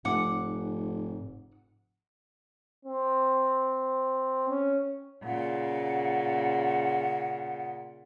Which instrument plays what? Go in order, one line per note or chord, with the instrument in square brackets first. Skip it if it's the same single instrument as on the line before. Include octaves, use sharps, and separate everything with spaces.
[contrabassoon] F1 [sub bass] G#2 [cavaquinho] F#5 D6
[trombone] C4
C#4
[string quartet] A#2 C#3 [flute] F#5